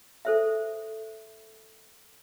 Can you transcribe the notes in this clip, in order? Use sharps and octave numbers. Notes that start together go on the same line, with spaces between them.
A4 C5 E5